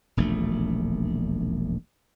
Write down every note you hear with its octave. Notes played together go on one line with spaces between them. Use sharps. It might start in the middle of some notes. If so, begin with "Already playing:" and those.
E1 A#1 D#2 A3